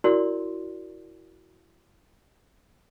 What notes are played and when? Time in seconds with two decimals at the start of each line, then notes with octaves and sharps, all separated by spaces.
0.04 E4 F#4 A#4 D5 C6